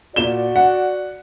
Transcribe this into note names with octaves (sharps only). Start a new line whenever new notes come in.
A#2 F#4 D5 E7 G7
F#5